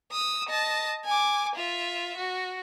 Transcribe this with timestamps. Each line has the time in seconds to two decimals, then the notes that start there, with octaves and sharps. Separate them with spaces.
0.12 D#6 E6
0.49 D#5 A5
1.05 G#5 D6
1.55 F4 E5
2.17 F#4